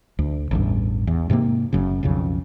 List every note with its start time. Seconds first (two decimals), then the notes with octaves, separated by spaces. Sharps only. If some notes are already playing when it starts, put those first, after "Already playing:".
0.19 D2
0.51 A1 E2 G2
1.07 E2
1.30 G#2 C3 G#3 A#3
1.73 F#1 F#2 C#3
2.03 B1 F2 C#3